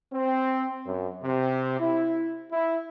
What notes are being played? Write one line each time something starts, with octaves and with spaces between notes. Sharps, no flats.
C4
F#2
C3
E4
E4